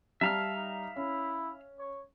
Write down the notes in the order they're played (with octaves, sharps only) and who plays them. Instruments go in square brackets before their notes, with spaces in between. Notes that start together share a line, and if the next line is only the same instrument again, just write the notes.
[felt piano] G3 A#5 [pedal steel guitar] E5 F5 F6 [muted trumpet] A5
[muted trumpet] D#4
[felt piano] C#4 [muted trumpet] E4
[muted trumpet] C#5